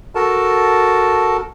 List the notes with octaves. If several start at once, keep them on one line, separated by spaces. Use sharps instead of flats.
F#4 A4 A#4 A5